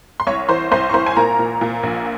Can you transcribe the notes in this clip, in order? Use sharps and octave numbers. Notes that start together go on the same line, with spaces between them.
C6
C2 C#5 C#6
E3 C5 C6
C2 C5 C6
C#6
C2 C5 C6
G#5
A#2 A#4 A#5
A#2
A#2
A#1